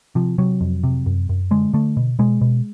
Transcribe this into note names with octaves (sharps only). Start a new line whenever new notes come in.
C3 F3
C3 F#3
F2
C3
F#2
F#2
D3 G#3
D3 A3
B2
B2 G#3
B2